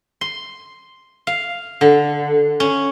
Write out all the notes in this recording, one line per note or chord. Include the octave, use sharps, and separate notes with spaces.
C6
F5
D3
C#4